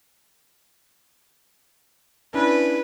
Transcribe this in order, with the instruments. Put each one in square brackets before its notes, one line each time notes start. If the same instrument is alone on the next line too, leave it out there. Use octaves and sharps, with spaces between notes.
[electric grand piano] C#4 D4 E4 [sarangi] B4